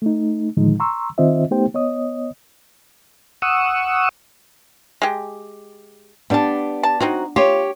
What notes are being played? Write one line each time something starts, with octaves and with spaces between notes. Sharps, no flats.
A3 D#4
A2 D3 D#3 F3 G#3 D#4
A#5 C6 C#6 E6
D#3 C4 F4 C5 D#5 E5
A3 B3 D#4 G4 C5 G5
B3 C#5 D#5 D#6
F#5 C#6 D#6 E6
G#3 G4
G3 B3 D4 G4 A5
A5
F#3 C4 D#4 F#4
F4 G4 C#5